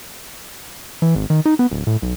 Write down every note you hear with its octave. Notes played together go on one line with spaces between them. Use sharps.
E3
G#1
D#3
D#4
B3
D1
A2
B1